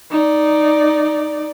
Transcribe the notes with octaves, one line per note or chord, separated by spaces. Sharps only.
D#4 D5